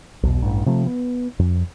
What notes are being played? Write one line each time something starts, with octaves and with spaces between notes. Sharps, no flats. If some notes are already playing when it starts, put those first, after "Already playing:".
B1 E2 B2
A1 G2
C3 F3 A3
B3
F2